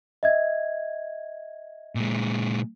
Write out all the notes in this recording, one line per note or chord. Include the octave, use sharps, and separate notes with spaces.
D#5 E5 G#6
A#2 G#3